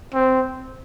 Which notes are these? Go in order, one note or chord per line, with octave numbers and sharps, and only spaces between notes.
C4